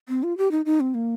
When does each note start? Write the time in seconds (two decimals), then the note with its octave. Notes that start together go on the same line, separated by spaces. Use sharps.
0.09 C4
0.23 F4
0.38 G4
0.51 D#4
0.66 D#4
0.80 C4
0.94 A#3